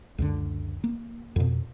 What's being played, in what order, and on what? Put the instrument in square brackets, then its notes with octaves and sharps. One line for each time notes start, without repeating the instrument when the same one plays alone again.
[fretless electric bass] C#2 F#2 D3
A#3
F2 B2